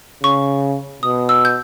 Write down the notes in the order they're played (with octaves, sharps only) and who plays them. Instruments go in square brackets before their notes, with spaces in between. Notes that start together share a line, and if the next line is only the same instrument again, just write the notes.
[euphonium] C#3 [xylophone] C#6
[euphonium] B2 [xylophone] D#6
[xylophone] E6
G6